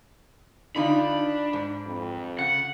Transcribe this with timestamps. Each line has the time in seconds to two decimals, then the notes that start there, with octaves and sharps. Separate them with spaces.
0.76 D3 D4 D#4 F4 B5
1.53 G#2
1.86 F2
2.39 C#3 F#5